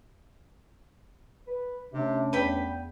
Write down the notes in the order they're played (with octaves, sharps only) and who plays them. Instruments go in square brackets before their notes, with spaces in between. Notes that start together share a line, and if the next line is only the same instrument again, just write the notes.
[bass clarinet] B4
[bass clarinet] C3 [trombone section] A3 C#4 D4
[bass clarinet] E2 [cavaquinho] B4 G5 B5